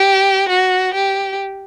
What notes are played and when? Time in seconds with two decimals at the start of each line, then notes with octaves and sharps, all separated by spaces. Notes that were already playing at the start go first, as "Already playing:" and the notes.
Already playing: G4
0.49 F#4
0.94 G4